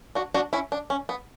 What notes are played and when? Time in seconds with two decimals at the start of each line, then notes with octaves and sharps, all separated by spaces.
0.15 D4 F#4
0.34 D4 F#4
0.53 C#4 E4
0.72 D4
0.90 C#4
1.09 B3